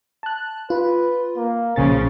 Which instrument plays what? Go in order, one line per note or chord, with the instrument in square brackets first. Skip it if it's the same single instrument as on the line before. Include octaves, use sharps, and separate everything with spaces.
[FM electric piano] A5 F#6
[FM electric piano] F4 [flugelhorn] B4
[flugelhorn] A#3
[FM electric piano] B1 A#2 A6 [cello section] C#3 F3 C#4 [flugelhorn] G#4